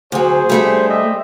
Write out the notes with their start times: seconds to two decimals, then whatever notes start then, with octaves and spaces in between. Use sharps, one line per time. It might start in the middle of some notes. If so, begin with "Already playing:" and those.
0.12 D2 F#3 G#4 C5
0.49 G3 A3 D4
0.89 G4 D#5 E5